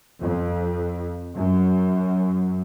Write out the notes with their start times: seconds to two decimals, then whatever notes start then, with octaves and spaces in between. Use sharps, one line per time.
0.20 F2
1.35 F#2